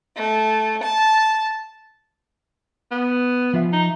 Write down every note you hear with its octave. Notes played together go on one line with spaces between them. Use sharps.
A3
A5
B3
F3 F4 E5
D#4